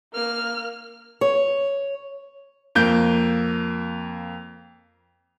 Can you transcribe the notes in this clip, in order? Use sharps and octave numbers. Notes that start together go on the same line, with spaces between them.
A#3 F6
C#5
F2 A#3 G6